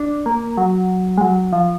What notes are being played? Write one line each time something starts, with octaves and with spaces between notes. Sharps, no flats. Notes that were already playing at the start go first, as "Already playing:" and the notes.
Already playing: D4
A#3
F#3
G#3
F#3
F3